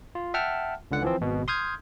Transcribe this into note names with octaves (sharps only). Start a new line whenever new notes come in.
F4
E5 F#5 G5 A5 F6
C#2 D3 F#5
E3 F3 C4
G#1 B2
C6 D#6 F6 G6 G#6